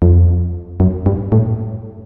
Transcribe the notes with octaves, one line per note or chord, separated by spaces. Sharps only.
F2
F#2
G2
A2